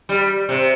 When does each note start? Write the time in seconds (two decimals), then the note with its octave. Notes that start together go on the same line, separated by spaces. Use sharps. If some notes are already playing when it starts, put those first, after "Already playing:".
0.09 G3
0.49 C3